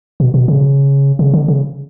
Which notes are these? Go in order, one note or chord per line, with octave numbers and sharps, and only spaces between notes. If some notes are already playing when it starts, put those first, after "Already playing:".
B2
B2
C#3
C#3
D3
C#3